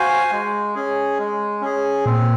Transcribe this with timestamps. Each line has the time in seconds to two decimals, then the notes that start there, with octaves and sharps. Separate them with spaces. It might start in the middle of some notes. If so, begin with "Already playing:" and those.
Already playing: F#4 C5 F5 G#5
0.31 G#3
0.75 C#4 G#4
1.19 G#3
1.61 C#4 G#4
2.06 A#2 C4